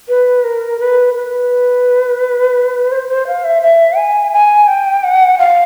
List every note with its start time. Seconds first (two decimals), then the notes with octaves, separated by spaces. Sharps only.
0.09 B4
0.44 A#4
0.80 B4
1.14 B4
2.92 C5
3.09 C5
3.27 F5
3.44 E5
3.62 E5
3.98 G#5
4.32 G#5
4.68 G5
5.03 F#5
5.39 F5